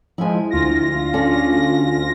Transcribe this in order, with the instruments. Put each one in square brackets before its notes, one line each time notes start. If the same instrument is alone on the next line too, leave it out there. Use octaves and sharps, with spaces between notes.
[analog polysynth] F3 G#3 [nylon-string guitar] E4 G#5
[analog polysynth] D2 F4 A#6
[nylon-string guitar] C#4 D4 A4